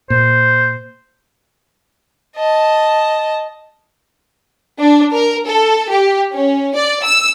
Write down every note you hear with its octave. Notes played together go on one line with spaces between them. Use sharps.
A#2 C5
D#5 A5
D4
A#4
A4
G4
C#4
D5
E6